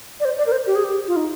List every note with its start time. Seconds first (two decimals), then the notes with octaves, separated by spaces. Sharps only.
0.20 D5
0.25 C5
0.38 D5
0.46 A#4
0.52 C5
0.67 G4
0.76 G#4
0.84 G4
1.08 F4
1.16 D#4